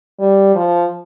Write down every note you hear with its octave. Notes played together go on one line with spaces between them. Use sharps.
G3
F3